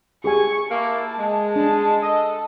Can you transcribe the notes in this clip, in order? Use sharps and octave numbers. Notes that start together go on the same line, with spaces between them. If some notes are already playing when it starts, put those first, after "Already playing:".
G4 G#4 G#5 C#6
A#3 E4 A5
G#3
D4 A5
A4 D#5